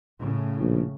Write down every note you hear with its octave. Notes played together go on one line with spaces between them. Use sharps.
A2 C#3
A#1